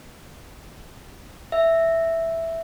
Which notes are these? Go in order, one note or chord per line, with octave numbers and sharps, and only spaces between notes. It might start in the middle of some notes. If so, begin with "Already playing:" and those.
E5